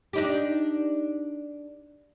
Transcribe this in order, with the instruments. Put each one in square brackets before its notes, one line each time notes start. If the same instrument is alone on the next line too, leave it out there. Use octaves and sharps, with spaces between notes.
[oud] D4 D#4 G4